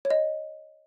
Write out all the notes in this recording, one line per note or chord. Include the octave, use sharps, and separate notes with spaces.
C#5
D#5